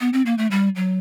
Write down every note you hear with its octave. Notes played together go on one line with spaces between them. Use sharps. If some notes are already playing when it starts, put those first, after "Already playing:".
B3
C4
A#3
A3
G3
F#3